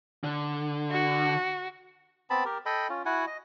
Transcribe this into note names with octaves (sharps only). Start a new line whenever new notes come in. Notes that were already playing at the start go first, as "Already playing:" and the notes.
D3
F#4
B3 C4 A5 B5
G4 A#4
A4 D#5 G5 B5
C#4 F4
E4 F#4 F#5 G#5
D#5